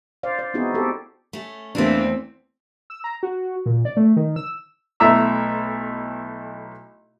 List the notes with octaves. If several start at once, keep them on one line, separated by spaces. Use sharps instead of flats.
C5 D5 F5
D5
B3 C4 D#4 E4 F#4 G#4
C4 G4 A4
A3 C#4
E2 E3 A3 A#3 C4 D4
E6
A#5
F#4
A#2
D5
A3
D#3
E6
B1 A3 E4 E5 A#5 E6